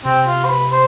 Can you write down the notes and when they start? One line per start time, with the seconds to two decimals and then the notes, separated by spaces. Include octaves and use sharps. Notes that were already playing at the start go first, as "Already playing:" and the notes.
0.05 C3 C4
0.27 F4
0.45 C5
0.50 B4
0.72 C5